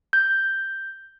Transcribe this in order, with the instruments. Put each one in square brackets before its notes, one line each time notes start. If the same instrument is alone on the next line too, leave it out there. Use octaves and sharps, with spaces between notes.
[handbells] G6